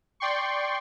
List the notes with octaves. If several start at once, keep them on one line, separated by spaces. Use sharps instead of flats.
D5 G5 C6 C#6